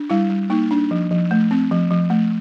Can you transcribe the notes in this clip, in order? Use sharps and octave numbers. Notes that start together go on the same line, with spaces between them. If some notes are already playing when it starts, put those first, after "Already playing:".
Already playing: D4
G3 E4
G3
A#3 D#4
D4
F3
F3
A3
C4
F3
F3
A3